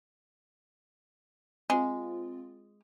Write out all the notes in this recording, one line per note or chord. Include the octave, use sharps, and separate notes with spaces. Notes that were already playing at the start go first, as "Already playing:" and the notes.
G#3 C4 F4